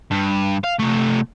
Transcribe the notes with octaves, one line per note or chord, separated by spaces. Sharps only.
G2
F5
C3 A3